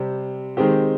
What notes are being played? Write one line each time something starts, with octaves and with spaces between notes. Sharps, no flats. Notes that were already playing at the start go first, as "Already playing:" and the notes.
Already playing: C3 G3 C4 G4
D#3 G#3 C4 G4